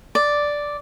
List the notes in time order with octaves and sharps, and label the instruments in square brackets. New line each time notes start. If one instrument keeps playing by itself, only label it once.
[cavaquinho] D5